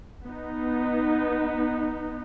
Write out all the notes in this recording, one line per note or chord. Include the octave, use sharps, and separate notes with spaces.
B3 D#4